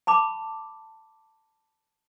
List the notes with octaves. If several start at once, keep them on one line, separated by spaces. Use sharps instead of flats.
A5 B5 D6